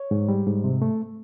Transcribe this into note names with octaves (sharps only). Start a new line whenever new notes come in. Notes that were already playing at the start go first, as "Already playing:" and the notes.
Already playing: C#5
G#2
G3
G#2
C3
A3